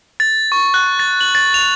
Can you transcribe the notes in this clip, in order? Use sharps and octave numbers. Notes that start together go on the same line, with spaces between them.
A6
C#6
F#6
A6
F#7
A6
F7